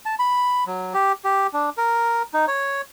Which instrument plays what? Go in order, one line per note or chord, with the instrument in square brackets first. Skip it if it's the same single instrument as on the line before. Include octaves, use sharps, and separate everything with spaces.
[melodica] A5
B5
F#3
G4
G4
D4
A#4
D#4
C#5